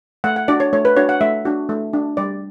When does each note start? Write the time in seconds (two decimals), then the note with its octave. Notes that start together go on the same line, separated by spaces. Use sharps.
0.24 A3 F#5
0.36 F#5
0.48 D4 F#4 D5
0.60 C#5
0.73 A3 C#5
0.85 B4
0.97 D4 F#4 C#5
1.09 F#5
1.21 A3 E5
1.45 D4 F#4
1.69 A3
1.93 D4 F#4
2.17 G3 D5